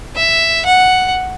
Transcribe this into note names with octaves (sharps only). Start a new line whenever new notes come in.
E5
F#5